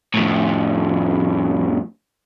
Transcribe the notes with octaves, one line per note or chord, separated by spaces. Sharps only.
F2 A2